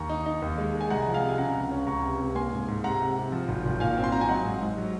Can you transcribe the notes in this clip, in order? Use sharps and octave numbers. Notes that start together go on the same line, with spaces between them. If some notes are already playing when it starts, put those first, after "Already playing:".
Already playing: D#2 A#5 C#6
D#4
D#4
D#2
G#3
G#3
G#5
C2 F#5 A#5
F3
F5 G#5
C3
G#5
C#3 F#5 A#5
C#2
C#4
C#2 A#5 C#6
C3
C3
A#3 G#5 C6
G#2
G#2
C3 F#5 A#5
C3
C3
F3
G#1
G#1
A#2 F5 G#5
C4
C6
C4 A#5
G#5
F#3 D#5 F#5
G#2
G#2
F#3